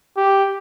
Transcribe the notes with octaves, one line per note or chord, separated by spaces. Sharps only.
G4